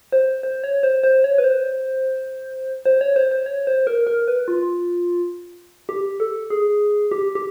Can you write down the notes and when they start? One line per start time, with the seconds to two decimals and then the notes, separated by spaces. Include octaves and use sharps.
0.12 C5
0.43 C5
0.64 C#5
0.83 C5
1.03 C5
1.24 C#5
1.38 B4
1.44 C5
2.85 C5
3.01 C#5
3.16 C5
3.31 C5
3.46 C#5
3.67 C5
3.87 A#4
4.07 A#4
4.28 B4
4.48 F4
5.89 G4
6.20 A4
6.50 G#4
7.11 G4
7.35 G4